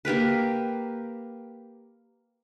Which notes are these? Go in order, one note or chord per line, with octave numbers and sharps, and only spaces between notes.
A#3 G4 A#4 B4